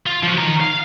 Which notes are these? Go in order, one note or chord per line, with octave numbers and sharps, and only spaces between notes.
F4
F3 F#4
D#3 A#5
F5